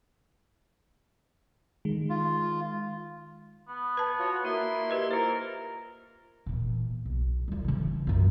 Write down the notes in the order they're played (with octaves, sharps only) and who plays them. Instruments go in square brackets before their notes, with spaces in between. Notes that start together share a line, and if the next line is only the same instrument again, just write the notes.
[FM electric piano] D#3 G#3
[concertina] F4
[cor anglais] B3
[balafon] B4 A5
[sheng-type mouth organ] F4 F#4 C#5
[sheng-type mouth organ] A#3 E4 C6 [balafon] F#4
[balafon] G4 B4 D#5
[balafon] F4 C5 [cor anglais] A#4
[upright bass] A#2 E3
B1
G3 F4
C#3 E3
F#2 F4